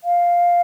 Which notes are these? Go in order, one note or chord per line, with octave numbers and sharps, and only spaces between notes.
F5